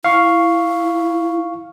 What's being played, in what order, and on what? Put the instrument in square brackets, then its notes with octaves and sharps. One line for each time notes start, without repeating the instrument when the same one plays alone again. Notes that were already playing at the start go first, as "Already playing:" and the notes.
[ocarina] E4 [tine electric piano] F5 C#6